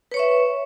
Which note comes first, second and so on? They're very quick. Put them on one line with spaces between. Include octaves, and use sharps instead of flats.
B4 C#5 C#6 E5